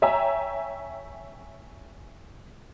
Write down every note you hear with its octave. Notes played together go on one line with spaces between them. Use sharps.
C#5 E5 G5 G#5 A#5